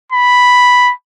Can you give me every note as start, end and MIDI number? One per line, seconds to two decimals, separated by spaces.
0.12 0.93 83